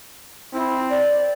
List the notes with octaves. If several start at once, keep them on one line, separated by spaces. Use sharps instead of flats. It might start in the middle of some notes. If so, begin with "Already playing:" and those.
C4 E4
D5